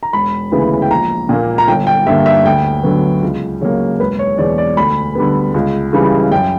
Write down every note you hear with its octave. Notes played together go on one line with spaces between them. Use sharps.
A#5
E1 B5
D2 C#3 E3 B3
G5
A#1 A#5
A#2 A#3
A#5
G1 G5
G5
G2 D3 A#3 E5
E5
D2 G5
D3 F#3 B3
C#2
C#3 F#3 A#3 C#5
E1 B4
C#5
E2 B2 D5
D5
D2 B5
D3 G3 B3
C#2
C#3 E3 G3
F#2 G5